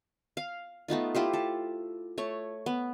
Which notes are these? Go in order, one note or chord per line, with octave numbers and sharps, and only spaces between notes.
F5
A3 B3 D#4 F4
E4 F4 G4 C5
A4
A3 C#5
B3